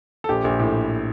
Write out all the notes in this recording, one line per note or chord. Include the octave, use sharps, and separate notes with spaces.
A4
A#1 G4
A#1
A2